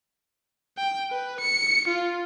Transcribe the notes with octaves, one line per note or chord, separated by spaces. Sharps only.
G5
B4
C#7
F4